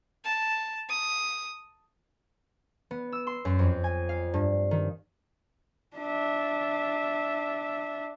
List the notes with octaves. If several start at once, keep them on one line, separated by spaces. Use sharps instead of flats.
A5
D#6
B3
E6
C6
F#2
F2
G#5
F5
G2
D#3
D4 E5